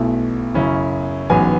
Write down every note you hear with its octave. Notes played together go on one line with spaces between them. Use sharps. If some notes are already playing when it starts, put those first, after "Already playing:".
Already playing: B1 B2 A3 E4
F#2 C#3 F#3 C#4 E4
A1 G#2 F#3 B3 G#5